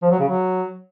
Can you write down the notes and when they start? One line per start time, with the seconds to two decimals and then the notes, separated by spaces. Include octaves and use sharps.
0.02 F3
0.11 F#3
0.20 C#3
0.28 F#3